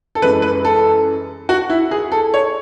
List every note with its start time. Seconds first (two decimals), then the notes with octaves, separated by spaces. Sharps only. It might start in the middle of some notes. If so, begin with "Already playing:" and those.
0.15 A4
0.22 F#2 E3 G#3 B4
0.42 B4
0.65 A4
1.49 F#4
1.70 E4
1.91 G#4
2.12 A4
2.34 C#5